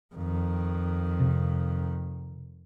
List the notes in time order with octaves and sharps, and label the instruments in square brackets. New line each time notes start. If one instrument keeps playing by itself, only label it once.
[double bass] F2 D#3
[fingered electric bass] C3